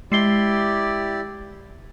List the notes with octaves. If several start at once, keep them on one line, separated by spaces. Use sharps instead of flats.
G#3 E4 G4 D5 C7 G7